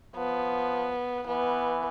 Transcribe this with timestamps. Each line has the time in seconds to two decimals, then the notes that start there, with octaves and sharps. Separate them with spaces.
0.16 F3 B3
1.27 E3 B3